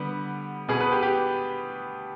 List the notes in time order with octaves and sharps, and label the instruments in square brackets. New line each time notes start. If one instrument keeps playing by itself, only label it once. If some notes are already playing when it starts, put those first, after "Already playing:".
Already playing: [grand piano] D3 G3 B3
B2 B3 G#4
B4
G4
G4